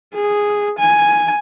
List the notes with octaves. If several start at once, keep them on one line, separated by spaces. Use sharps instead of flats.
G#4
G#5